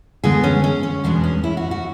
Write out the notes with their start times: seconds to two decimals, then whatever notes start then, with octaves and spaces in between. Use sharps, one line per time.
0.24 D2 D3 G#3 B3 G#4
0.44 C#4
0.64 C#4
0.83 C#4
1.04 E2 B2 G#3 B3 D4
1.24 C#4
1.44 E4
1.57 F#4
1.71 F#4